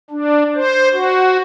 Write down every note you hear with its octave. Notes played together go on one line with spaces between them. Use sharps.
D4
C5
F#4